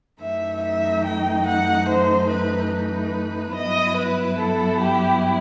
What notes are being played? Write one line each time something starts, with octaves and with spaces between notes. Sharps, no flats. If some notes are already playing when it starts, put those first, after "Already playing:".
F#2 E3 A3 D#4 E5
E5
G5
F#5
C5
B4
B4
G2 F#3 B3 E4 D#5
B4
A4
G4